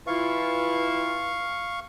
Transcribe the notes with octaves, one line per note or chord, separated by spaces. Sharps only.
E3 E4 F4 F5 C#6